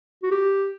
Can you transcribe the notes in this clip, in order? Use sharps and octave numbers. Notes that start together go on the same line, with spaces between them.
F#4
G4